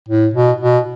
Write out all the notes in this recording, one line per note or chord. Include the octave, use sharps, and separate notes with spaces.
A2
B2
B2